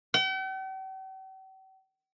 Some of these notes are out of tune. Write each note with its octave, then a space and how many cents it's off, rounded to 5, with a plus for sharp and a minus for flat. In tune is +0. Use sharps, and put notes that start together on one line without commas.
G5 -45